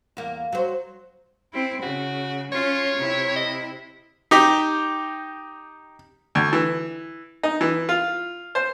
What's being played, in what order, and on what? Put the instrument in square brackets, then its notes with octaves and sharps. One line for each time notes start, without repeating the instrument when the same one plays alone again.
[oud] E2 A#3
F#3 C5
[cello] C4 E4
[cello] C#3 [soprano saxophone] F#4
[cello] C#4 F4 [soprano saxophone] C#5
[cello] C3 E4
[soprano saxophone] D#5
[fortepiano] D#4 G4
D2
E3
D#4
E3
F4
C5